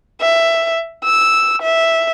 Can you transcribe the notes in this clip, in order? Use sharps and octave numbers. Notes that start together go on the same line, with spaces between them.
E5
E6
E5